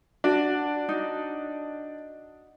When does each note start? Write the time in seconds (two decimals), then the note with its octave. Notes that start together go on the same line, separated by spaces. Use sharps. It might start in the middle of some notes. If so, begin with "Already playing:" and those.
0.24 D4 F#4
0.89 D#4 F#4